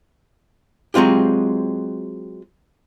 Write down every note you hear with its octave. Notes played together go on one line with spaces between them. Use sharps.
F#3 G#3 C4 F4 G4